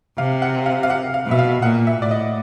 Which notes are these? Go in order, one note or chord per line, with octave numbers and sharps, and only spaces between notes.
C3 F5
F#5
F5
F5
F#5
F5
B2 E5
F5
A#2 F#5
E5
A2 D5
D#5